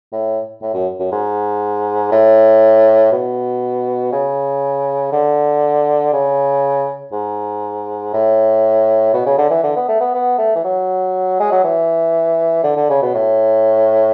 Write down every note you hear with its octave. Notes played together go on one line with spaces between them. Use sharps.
A2
A2
F#2
F#2
G#2
A2
B2
C#3
D3
C#3
G#2
A2
B2
C#3
D3
E3
D3
B3
A3
B3
B3
A3
E3
F#3
G#3
F#3
E3
D3
D3
C#3
B2
A2